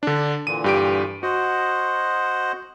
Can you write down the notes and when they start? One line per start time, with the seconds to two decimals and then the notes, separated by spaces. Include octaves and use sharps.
0.03 D3 D4 D5
0.47 A#2 D3 E3 D#7
0.64 G2 G4 D7
1.23 F#4 C5 D#5 F#5